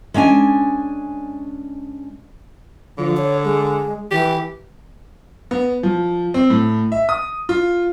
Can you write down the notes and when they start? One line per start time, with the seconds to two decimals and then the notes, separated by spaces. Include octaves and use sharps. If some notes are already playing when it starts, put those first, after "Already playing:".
0.14 G#3 C#4 D4 F#5 G#5
2.98 D3 F3
3.17 C#5
3.45 G#3
4.11 E3 G4
5.51 B3
5.83 F3
6.34 C4
6.50 A2
6.92 E5
7.09 D#6
7.49 F4